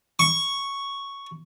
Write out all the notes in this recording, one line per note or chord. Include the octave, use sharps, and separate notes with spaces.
C#6